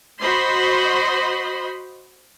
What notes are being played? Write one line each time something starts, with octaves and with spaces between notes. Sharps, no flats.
F#4 C5 D#5 B5 C6